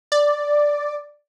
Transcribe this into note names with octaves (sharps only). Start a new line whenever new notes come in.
D5